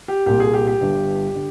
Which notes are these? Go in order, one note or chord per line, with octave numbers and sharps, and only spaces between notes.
G4
C2 A#2 G4
G#4
G4
G4
G1 G2 D3
D3